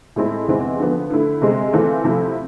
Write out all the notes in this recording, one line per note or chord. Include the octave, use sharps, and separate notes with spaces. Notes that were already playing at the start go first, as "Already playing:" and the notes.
A2 G#3 C4 E4 A4
E2 C3 E3 G#3 C4
D3 F3 B3
D3 A3 E4
C3 G#3 C4
E3 A3 C4 F4 A4
C3 F3 A3 E4